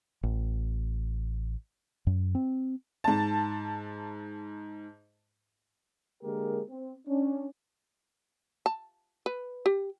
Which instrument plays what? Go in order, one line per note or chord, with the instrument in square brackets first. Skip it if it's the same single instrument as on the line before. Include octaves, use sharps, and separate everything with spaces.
[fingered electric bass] A1
F#2
C4
[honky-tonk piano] G#2 A5
[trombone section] D3 G#3 A#3 G4 G#4 A#4
C4
C#4 D4
[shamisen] A5
B4
G4